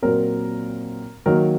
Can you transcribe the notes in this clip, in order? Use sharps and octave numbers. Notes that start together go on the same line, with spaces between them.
A#2 F#3 C4 A#4
D#3 F#3 A#3 A#4